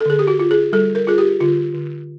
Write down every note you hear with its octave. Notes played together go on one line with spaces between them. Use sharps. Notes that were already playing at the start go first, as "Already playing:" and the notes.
A4
D3 G#4
G4
F#4
F4
G#4
G3 A4
A#4
F4 G#4
G4
D3 F4
D3